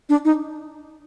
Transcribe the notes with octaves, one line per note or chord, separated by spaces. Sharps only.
D4
D#4